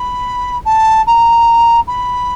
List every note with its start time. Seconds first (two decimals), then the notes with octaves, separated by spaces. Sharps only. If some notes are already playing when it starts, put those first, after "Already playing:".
Already playing: B5
0.65 A5
1.07 A#5
1.87 B5